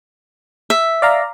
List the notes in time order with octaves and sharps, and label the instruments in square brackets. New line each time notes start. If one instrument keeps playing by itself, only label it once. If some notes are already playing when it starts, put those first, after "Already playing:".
[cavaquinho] E5
[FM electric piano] D5 F5 A#5